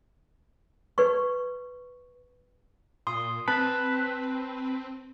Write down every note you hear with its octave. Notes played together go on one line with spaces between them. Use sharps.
B4 C#6
A#2 C6 D#6
C4 B4 A5